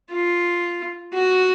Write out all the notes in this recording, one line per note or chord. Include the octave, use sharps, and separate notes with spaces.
F4
F#4